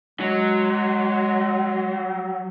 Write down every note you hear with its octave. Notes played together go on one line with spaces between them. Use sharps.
F#3 G#3